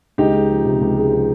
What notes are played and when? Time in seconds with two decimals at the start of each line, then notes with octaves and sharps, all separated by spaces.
0.18 C#2 D#4 G4
0.34 G#3
0.49 F3
0.65 C3
0.81 C#2
0.96 G#3
1.12 F3